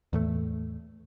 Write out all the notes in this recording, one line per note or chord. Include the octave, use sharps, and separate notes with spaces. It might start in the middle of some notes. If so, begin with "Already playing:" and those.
E2 A2 A3